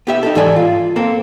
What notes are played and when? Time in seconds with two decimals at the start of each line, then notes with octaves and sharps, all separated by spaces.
0.07 B3 G4 E5
0.23 D#4 G4 A4
0.35 G#2 E3 A4 D5 G#5
0.56 F4
0.96 A#3 C4 A4